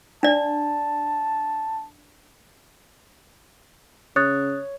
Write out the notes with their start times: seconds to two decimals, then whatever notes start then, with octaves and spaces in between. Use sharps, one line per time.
0.23 D4 D5 A5
4.16 C#3 C#5 D#6 F#6 A6